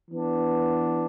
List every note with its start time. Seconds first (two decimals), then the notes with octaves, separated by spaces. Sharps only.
0.11 E3 B3 D4